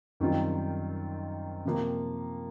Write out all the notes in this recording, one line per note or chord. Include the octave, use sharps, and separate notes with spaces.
F#2 D#3 G3 C4 F4
C3 F3 A#3